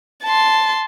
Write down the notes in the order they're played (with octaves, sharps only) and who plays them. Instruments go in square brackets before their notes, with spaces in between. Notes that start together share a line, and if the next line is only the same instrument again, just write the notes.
[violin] A5 C6